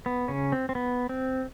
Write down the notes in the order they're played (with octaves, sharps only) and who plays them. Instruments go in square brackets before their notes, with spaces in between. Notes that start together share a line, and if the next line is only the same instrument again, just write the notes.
[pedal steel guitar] B3
C#3 C#4
C4
C4
B3
C4